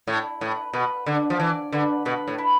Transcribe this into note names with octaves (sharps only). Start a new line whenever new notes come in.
A2 E4
A2 B4
B2 B4
D3 B4
F3
E3 D5
D3 B4
B2 B4
A2
E4